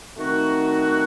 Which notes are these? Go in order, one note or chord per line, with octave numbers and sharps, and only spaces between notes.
D#3 A3 C4 D#4 F#4